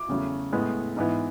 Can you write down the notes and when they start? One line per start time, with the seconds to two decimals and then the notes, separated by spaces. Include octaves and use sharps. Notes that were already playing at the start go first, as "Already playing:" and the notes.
Already playing: D6
0.08 E2 C#3 F#3 A3
0.52 A2 G#3 B3
0.97 G#2 E3 B3